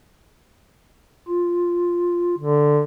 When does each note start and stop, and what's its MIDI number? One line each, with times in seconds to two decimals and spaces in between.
1.28 2.35 65
2.38 2.82 50